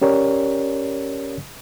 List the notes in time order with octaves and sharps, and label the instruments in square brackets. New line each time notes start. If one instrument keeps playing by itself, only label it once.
[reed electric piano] C#4 G4 A#4 C#5 D5